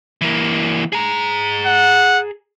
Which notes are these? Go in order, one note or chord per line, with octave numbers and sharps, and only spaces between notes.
E3 A#3
G#4 A#5
F#5